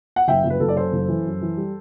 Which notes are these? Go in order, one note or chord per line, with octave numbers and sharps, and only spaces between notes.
F#5
F#1 E5 G5
F#1
B4
F#1 A4
D5
F#2 A4 C5
F#1
E3
F#2
E3
G3